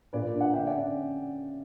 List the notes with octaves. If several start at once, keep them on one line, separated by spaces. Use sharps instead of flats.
A#2 B4 D5
D4
D5 F#5
D3 E5 G5
D5 F#5
C#4